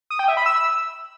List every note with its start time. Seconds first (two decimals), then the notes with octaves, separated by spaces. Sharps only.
0.10 D#6
0.19 G5
0.28 E5
0.37 B5
0.46 E6